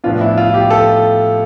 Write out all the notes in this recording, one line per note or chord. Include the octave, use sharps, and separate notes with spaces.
A2 F3 B3 D4 F4
E4
F4
G4
A4